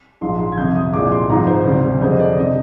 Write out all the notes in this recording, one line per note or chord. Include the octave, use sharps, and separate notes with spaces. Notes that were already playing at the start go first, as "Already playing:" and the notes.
A#1 G#2 F3 G#3 C6
C6
G#6
G1 F2 C3 G6
D#6
C2 A#2 F3 G#3 D6
C6
G#1 G#2 F3 A#5
C5
D2 C3 G3
F2 D3 G#3 C5
D#5
D5
C3 G3 D#5